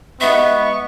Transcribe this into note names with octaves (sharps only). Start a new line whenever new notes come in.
G3 G#3 B3 D#4 E5 C#6